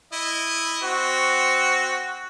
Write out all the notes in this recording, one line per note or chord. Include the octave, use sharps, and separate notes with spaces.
E4 D#5
C4 F#4